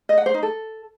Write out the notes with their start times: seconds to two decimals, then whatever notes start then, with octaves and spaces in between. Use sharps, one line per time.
0.09 D#5
0.18 F#5
0.26 C5
0.34 D#4
0.43 A4